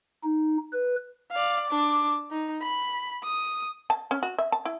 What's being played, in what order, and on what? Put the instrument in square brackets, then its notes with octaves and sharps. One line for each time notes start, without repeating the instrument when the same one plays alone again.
[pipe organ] D#4
B4
[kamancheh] D5 F5
D4 D6
D#4
B5
D#6
[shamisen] A5
C#4
F#4
E5
A5
E4